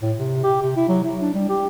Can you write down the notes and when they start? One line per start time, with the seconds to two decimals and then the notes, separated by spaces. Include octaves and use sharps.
0.02 A2
0.18 C3
0.44 G4
0.62 C3
0.76 E4
0.89 F#3
1.04 E4
1.21 D4
1.34 G3
1.49 G4